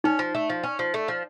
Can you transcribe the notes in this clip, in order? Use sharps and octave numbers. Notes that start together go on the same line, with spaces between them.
C#4 D#4
F3
A3
F3
C#4
F3
A3
F3